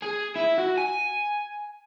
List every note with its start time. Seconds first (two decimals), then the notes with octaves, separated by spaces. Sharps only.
0.02 G#4
0.36 E4
0.58 F#4
0.78 G#5